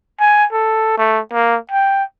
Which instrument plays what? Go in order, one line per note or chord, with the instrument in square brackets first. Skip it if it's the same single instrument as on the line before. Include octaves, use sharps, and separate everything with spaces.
[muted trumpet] G#5
A4
A3
A#3
G5